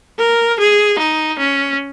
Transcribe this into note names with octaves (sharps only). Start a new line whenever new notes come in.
A#4
G#4
D#4
C#4